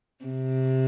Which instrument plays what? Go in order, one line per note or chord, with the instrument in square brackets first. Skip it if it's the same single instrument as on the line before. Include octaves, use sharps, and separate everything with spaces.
[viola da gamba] C3